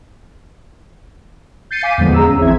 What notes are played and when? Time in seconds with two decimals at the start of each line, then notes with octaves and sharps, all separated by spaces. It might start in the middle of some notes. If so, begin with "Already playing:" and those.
1.71 G6 A6 C7 C#7 D#7
1.83 F5 G#5 D6 B6 D#7
1.98 E2 A2 D3 F3 G#3 B3
2.14 G#4 A#5 E6
2.27 C#4
2.41 A1 E3 C4 E5 G#6